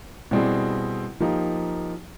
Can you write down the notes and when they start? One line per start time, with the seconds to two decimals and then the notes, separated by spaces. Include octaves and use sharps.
0.31 B2 G3 C4 E4 G#4
1.20 F3 A#3 D#4 G4